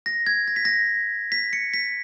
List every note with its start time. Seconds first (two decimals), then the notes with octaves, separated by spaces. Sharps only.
0.06 A#6
0.26 G#6
0.48 A#6
0.56 B6
0.65 A#6
1.32 B6
1.53 C#7
1.74 B6